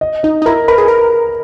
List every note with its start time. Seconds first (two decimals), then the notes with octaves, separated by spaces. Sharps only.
0.01 D#5
0.23 D#4 D#5
0.42 D#4
0.46 E4 A#4 A#5
0.68 A#4 B4 B5
0.78 G#4
0.88 A#4